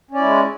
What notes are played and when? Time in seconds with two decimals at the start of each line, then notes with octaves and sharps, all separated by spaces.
0.11 C#4
0.15 D5
0.18 E4
0.22 G#3